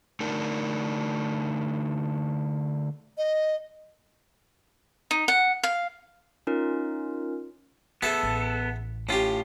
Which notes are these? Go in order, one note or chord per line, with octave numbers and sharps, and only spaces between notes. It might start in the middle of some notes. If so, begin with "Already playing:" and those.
D3 A3 D4 D#4 A#4
D#5
D#4
F#5
F5
C#4 D#4 F4 A#4
B3 G#4 A4 E5 A5
A1
A2 C#4 F4 G4